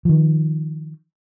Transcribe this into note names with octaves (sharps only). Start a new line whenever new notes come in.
D#3 F3